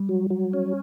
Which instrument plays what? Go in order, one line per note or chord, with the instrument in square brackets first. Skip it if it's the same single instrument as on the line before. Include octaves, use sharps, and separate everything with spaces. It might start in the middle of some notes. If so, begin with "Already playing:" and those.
Already playing: [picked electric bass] G3
[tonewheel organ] F#3
F#3
C#4